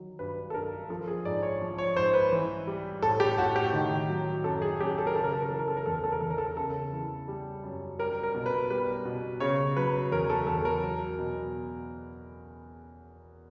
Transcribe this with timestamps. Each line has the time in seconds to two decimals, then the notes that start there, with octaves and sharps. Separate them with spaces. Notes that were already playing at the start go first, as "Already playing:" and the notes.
Already playing: D#3 F#3
0.19 G2 B4
0.50 A4
0.54 G2 A#4
0.90 F3 A4
1.08 G#4
1.25 G#2 D5
1.43 C#5
1.61 F3
1.78 C#5
1.96 G#2 C5
2.14 B4
2.32 E3
2.67 G3
3.02 A2 A4
3.20 G4
3.38 A2 F#4
3.56 G4
3.73 D#3
4.09 F#3
4.44 F#2 A4
4.62 G#4
4.80 F#2 G4
4.98 A4
5.07 A#4
5.15 C#3 A4
5.24 A#4
5.33 A4
5.42 A#4
5.50 E3 A4
5.59 A#4
5.68 A4
5.77 A#4
5.86 E2 A4
5.95 A#4
6.04 A4
6.12 A#4
6.21 E2 A4
6.30 A#4
6.38 A4
6.57 C#3 A4
6.93 E3
7.28 G3
7.64 F#2
7.99 G3 A#4
8.23 A#4
8.35 B2
8.46 B4
8.70 G3 B4
9.05 B2
9.40 C#3 C#5
9.76 F#3 B4
10.12 E2 A#4
10.30 A4
10.47 E2 A4
10.65 A#4
10.83 F#3
11.18 B2